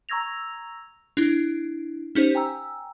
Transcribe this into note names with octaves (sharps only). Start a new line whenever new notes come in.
A#5 C#6 E6 G#6 A#6 F7
D4 E4
C#4 D#4 G4 C5
G5 G#5 A#5 E6